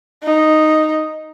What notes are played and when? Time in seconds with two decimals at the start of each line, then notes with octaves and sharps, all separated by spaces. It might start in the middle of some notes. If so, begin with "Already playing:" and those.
0.23 D#4